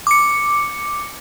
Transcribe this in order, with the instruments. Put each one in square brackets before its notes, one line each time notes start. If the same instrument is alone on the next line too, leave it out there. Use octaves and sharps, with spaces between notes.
[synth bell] D6 C#7